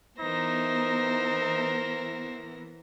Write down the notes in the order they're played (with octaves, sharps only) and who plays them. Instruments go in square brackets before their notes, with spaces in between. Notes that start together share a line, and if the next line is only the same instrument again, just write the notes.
[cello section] E3 B3 [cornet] D#4 [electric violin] A#4 A#6 [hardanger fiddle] C5 E5